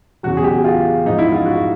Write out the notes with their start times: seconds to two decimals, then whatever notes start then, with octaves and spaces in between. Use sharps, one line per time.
0.23 E2 C#3 F#3 F#4
0.37 G#4
0.44 G4
0.64 F4
1.05 G#2 F3 D#4
1.18 E4
1.32 F4
1.46 F#4